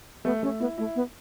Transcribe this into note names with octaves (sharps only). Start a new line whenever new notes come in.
A3 B3
A3 C#4
B3 E4
A3 E4
B3